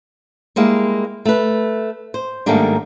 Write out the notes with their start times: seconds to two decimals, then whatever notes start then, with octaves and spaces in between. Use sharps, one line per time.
0.56 G3 G#3 A#3 E4
1.25 A3 B4
2.14 C5
2.46 G#2 D#3 G3 A3 A#3 D4